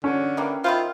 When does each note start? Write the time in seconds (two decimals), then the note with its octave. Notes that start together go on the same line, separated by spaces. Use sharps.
0.04 D3 C#4
0.37 E3 G3 A#3
0.64 D#3 E4 F4 C5